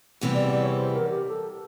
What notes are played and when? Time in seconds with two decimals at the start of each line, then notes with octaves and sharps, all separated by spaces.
0.21 E2 C3 E3 G3 B3
0.34 D5
0.48 D5
0.62 C#5
0.75 C5
0.93 A#4
1.10 G4
1.28 A4